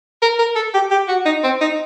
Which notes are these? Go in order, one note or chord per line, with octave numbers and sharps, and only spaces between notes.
A#4
A#4
A4
G4
G4
F#4
D#4
C4
D#4